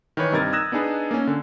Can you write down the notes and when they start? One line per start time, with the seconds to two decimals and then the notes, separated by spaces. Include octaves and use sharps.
0.17 D#3 E3 B4 C#5
0.32 G2 C3 D#4 A#4 G#6 A6
0.53 D#6 E6 F#6 G#6 A#6 E7
0.72 B3 D4 D#4 G#4 B4
1.11 A#3 C#4
1.27 D3